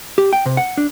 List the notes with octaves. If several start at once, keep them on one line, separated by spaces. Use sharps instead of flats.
G4
G5
C3
F#5
D4